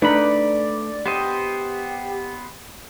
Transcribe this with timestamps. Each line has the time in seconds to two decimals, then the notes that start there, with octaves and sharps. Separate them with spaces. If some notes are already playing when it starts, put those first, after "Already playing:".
0.02 A3 D4 D#4 B4 D5 B5
1.06 B3 G4 C5 D#5